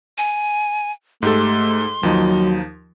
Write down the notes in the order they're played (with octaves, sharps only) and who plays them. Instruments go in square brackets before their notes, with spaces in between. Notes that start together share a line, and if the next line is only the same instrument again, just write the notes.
[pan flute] G#5
[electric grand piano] G#2 G4 A4 [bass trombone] A3 [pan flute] C6
[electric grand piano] D#2 F3 D#4 [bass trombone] F#3